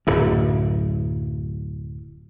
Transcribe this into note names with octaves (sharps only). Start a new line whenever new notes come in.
D1 F#2